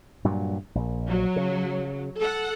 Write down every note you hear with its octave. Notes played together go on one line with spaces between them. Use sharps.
G2 A#2 F#3
A#1
F#3
C#3
A4 F#5